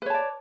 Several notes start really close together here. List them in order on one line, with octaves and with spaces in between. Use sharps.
B4 C#5 A5 D5